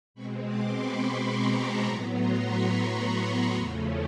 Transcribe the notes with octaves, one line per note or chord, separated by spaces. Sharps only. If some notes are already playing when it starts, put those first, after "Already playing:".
B2 G#3 C4 B5 C#6
C6 D6
B5 C#6
B5 C#6
A#5 C6
A5 B5
A2 F#3 B3 G#5 A#5
A#5 C6
B5 C#6
B5 C#6
E2 C#3 F3 A3 C#4